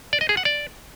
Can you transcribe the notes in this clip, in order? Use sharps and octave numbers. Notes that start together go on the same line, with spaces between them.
D5
D#5
G#4
F#5
D5